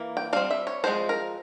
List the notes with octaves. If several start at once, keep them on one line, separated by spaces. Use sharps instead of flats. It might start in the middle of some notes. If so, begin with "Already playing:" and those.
Already playing: E3 A#3
G5
G3 C4 F5
E5
C#5
F3 G#3 C4 C5
A#4